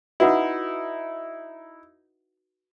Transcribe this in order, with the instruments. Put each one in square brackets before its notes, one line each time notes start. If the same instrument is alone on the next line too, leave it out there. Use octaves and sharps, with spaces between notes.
[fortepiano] D#4 E4 [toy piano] F#4 B4 F#5